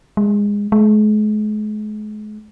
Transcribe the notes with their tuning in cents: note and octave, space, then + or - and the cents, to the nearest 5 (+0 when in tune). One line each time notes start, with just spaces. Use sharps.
G#3 -20
G#3 +40